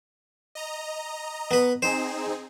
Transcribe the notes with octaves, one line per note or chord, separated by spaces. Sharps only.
D#5 A#5
B3 B4
C4 D#4 G#4 C5